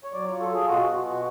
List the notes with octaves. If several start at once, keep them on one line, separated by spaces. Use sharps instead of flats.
C#5
F#3 D5
F4 C#5
A4
F4 G#4
B2 F#4
F#4
B3
B2 F#4